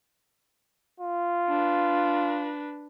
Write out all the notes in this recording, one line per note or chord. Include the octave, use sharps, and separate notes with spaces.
F4
D4 B4